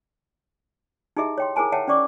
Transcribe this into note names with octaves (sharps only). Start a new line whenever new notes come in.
D#4 E4 G4 G#4 D#5 E5
C#5 G5 C6
E4 G#4 A#4 C5 G#5 A5
C#5 E5 F#5 G5 A5
C#4 C5 D5 C#6 D6